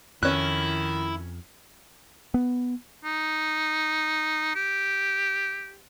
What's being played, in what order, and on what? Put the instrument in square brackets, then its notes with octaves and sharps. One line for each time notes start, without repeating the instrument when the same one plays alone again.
[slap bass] F2 [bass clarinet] D#3 [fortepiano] C#4 F#6 [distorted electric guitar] E4
[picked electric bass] B3
[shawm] D#4
G4